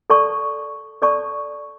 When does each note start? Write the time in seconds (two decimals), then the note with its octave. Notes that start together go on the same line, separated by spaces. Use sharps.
0.10 A4 D5 A5 C#6
1.02 A4 D5 A5 C#6